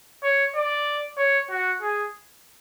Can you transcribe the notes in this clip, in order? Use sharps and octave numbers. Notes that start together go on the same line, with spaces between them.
C#5
D5
C#5
F#4
G#4